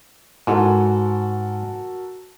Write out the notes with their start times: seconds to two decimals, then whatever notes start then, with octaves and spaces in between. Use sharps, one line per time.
0.47 G#2 F#4 A4 A#4